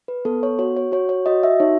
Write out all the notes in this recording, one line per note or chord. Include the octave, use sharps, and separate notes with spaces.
B4
B3 A4
C#5
F#4 C#5
C#5
F#4 C#5
C#5
F#4 D#5
E5
D#4 C#5